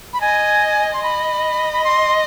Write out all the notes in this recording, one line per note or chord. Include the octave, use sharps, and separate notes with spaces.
B5
D#5 G#5
C6
D#5 B5
B5
C6